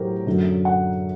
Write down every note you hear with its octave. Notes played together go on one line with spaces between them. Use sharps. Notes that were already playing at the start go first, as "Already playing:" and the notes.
Already playing: A2 F#3 F#4 G4 A#4 C5
F#2 D3 F#3
F#5